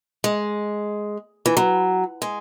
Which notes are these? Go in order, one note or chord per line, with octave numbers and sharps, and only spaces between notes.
G#3
E3
F#3
G#3